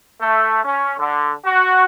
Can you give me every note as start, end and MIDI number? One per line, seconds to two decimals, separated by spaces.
0.21 0.60 57
0.64 0.92 61
0.98 1.32 50
1.45 1.85 66